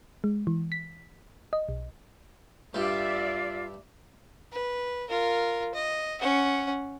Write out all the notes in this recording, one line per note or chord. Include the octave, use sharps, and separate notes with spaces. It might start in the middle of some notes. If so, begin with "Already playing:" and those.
G#3
E3
B6
D#5
B1
G2 G3 F4 D5 E5
B4
F4 A#4
D#5
C#4 F#5